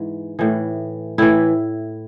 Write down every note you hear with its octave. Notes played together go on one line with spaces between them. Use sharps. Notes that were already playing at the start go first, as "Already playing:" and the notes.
Already playing: G#2 E3
A2 E3
A2 E3 E4